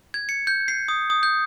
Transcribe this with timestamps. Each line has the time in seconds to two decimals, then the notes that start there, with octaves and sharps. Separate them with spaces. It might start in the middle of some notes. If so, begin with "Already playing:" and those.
0.14 G#6
0.29 C#7
0.47 G6
0.68 C7
0.88 D#6
1.10 D#6
1.23 G6